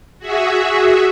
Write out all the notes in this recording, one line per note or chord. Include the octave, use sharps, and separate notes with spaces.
F#4 G#4 E5